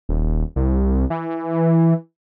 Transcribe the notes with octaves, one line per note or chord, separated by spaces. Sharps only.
D#1
C2
E3